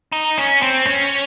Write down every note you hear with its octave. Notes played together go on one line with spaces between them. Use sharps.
D#4
C#4
C4
C#4